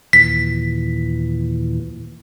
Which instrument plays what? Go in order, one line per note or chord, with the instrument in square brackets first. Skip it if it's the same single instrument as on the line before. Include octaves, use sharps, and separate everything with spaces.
[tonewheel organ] D#2 A#2 E3 [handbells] B6